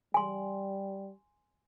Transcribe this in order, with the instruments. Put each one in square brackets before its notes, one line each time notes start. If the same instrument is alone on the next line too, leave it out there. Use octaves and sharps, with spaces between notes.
[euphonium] G3 [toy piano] G#5 C6